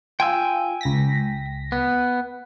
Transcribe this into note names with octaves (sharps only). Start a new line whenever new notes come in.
F4 G5 G#5 E6
C#2 A#6 B6
B3